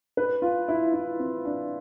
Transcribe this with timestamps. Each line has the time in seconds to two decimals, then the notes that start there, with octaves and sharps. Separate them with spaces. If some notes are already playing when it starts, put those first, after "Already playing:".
0.17 B4
0.42 F4
0.68 E4
0.93 E4
1.19 C4
1.45 D4